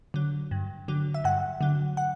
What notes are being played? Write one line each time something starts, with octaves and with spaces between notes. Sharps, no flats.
D3 F#3
G2
D3 F#3
E5
G2 F#5
D3 F#3
F#5